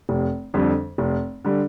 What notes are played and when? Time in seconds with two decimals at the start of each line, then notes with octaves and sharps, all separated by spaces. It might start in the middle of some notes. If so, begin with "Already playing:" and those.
0.09 F1
0.54 F2 D3 G3
0.98 F1
1.45 D3 G3